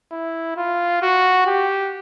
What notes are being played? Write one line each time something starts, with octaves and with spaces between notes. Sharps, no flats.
E4
F4
F#4
G4